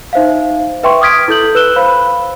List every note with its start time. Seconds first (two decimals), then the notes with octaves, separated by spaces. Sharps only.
0.13 D#4 C5 E5 F5
0.83 B4 E5 G5 C6 C#6
1.01 D6 D#6 F6 G#6 B6 D7
1.28 E4 A4 G6 F#7
1.55 B4 E6 F#6 E7 G7
1.76 C5 F5 B5